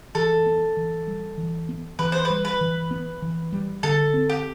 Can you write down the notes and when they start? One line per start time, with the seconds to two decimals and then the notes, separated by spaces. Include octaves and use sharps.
0.15 E3 A4
0.46 B3
0.77 E3
1.07 G3
1.38 E3
1.69 B3
1.99 E3 B4
2.12 C5
2.25 B4
2.30 G3
2.45 B4
2.61 E3
2.91 B3
3.22 E3
3.52 G3
3.83 D3 A4
4.14 C4
4.29 G4